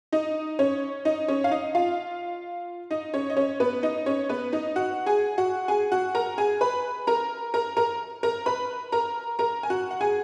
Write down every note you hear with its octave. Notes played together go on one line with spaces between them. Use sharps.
D#4 D#5
C#4 C#5
D#4 D#5
C#4 C#5
F5
D#4 D#5
F4 F5
D#4 D#5
C#4 C#5
D#5
C#4 C#5
B3 B4
D#4 D#5
C#4 C#5
B3 B4
D#4 D#5
F#4 F#5
G#4 G#5
F#4 F#5
G#4 G#5
F#4 F#5
A#4 A#5
G#4 G#5
B4 B5
A#4 A#5
A#4 A#5
A#4 A#5
A#4 A#5
B4 B5
A#4 A#5
A#4 A#5
G#5
F#4 F#5
F#5
G#4 G#5